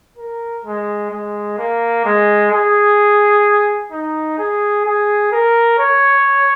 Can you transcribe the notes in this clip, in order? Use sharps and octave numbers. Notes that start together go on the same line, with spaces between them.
A#4
G#3
G#3
A#3
G#3
G#4
D#4
G#4
G#4
A#4
C#5